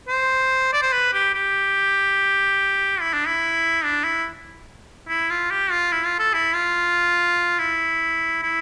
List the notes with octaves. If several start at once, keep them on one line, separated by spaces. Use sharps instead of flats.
C5
D5
C5
B4
G4
G4
E4
D4
E4
D4
E4
E4
F4
G4
F4
E4
F4
A4
E4
F4
E4
E4